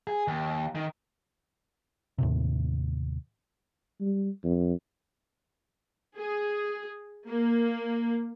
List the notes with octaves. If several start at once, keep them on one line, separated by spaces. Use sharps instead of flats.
G#4
D#2
D#3
D#2 A2 C3
G3
F2
G#4
A#3